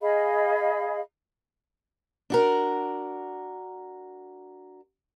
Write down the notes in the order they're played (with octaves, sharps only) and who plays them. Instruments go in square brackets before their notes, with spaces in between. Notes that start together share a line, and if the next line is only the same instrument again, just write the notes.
[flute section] G#4 D#5 F5 B5
[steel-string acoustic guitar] D4 F#4 A#4